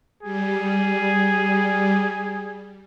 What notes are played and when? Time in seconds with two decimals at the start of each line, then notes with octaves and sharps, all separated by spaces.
0.23 G3 G#4